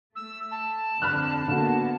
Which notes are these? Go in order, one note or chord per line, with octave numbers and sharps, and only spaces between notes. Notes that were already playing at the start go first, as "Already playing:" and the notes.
A3 E6
A5
F2 D3 B5 F6 F#6
D3 A#3 B3 F#4